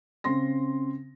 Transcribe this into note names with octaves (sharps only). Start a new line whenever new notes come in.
C#3 C4 C6 A#6